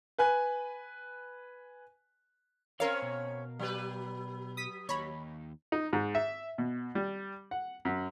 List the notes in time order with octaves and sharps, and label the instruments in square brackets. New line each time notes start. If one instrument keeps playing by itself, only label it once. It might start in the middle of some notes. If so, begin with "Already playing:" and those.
[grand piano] B4 G#5 F#6
[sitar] C4 C#4 C#5 [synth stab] A#4 F5 [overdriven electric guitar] C5 B5
[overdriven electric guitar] B2
[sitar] F#3 G4 B4
[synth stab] D#6 B6
[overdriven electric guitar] D#2 D#4 [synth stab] C#5 B5
[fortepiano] D#4
G#2
E5
B2
G3
F#5
F#2